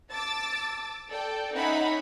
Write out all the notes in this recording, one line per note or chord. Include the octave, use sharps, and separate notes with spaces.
A5 D6 E6 A6
A4 D5 G5
C#4 D#4 E5 F#5 B5